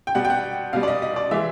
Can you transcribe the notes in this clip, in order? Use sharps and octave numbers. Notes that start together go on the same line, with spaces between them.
G5
B2 G3 F#5
G5
F#5
B2 G3 F5
D5
D#5
D#5
D5
E3 G#3 E5